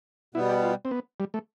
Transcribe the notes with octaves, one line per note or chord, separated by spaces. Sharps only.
B2 G3 B3 E4
G4
F4
C4
B3
G3
A3